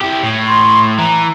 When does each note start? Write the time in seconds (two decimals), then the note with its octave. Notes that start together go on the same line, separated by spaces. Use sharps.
0.02 E4 G4
0.24 A2
0.48 C6
0.98 E3 A#5